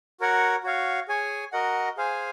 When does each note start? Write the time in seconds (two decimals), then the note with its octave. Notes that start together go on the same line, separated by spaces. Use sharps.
0.20 F#4 A#4 C#5 F#5
0.64 F#4 C#5 F5
1.08 G#4 C#5 G#5
1.52 F#4 A#4 D#5 F#5
1.97 G#4 C5 F5 G#5